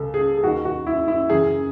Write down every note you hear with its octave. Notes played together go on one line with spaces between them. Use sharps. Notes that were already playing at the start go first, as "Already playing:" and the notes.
Already playing: C#2 A4
G#4
G#4
D#2 D#3 F#4
F#4
E4
E4
F#2 C#3 E3 G#4